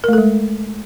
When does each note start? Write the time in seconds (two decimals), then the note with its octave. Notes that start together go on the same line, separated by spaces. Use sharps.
0.04 A#4
0.08 A3
0.13 A4
0.18 G#3